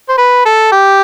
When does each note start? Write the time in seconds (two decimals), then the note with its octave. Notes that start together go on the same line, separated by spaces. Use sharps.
0.09 C5
0.18 B4
0.45 A4
0.72 G4